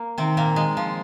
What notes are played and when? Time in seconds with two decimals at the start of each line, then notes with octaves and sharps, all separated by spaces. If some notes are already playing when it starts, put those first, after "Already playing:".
Already playing: A#3
0.18 C3 D#3 C4
0.37 A#2 A#3
0.56 G#3
0.77 F3